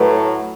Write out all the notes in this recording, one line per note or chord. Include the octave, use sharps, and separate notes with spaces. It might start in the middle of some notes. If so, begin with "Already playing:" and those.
Already playing: A2 F#3 A3 B4